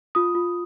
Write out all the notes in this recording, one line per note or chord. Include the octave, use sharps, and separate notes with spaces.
F4 D#6
F4